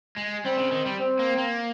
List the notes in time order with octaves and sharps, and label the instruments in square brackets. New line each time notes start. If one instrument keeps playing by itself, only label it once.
[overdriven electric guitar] G#3
[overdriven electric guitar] G3 [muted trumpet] C4
[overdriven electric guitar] C#3
D#3
G3
[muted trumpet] C4
[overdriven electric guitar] A#3
A#3